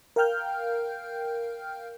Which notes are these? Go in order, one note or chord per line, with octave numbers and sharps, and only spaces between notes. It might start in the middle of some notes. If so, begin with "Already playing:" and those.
A#4 F5 G5 F6 G6